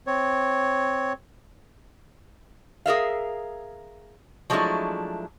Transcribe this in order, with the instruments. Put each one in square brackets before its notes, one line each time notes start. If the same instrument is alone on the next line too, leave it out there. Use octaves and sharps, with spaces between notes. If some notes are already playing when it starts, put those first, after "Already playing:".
[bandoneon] C4 C#5
[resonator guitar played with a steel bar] G#4 A#4 E5 F5
F3 F#3 G#3 A3 D4 E4